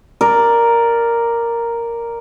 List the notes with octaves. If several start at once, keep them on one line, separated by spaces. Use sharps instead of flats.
A#4 D5